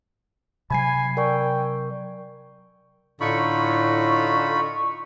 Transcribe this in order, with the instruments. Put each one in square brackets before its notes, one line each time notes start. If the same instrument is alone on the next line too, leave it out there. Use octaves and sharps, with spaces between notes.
[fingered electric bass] C3 F#3 [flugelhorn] G#5 [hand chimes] B5 G#6 C7
[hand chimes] A#4 D5 C#6 [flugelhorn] G5
[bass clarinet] A2 [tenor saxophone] D3 [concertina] D#4 F4 B5 [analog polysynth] C#6